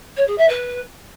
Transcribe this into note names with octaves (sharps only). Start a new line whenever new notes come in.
C#5
G#4
E5
B4